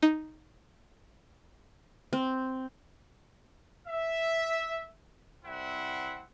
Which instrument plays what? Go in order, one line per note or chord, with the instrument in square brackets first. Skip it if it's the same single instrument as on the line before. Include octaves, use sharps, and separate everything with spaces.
[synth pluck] D#4
[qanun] C4
[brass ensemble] E5
C2 C4 E4 F#5